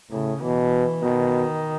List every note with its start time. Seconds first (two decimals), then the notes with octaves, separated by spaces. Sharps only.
0.11 A2 C#3
0.42 B2 E3
1.02 B2 D#3